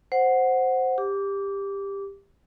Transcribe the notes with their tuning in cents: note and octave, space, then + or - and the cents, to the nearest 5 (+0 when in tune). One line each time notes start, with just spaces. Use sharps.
C5 +0 F#5 +0
G4 +20 D6 -20